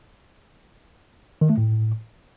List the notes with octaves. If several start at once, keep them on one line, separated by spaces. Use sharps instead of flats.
D#3
A3
A2